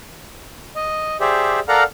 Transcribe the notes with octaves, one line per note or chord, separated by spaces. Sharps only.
D#5
G4 G#4 C5 D5 E5
A4 A#4 D5 F5 F#5 A#5